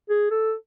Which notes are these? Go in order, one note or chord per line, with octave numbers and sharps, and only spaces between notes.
G#4
A4